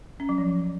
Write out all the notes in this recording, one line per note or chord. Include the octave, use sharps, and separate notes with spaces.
C#4
F#3
F3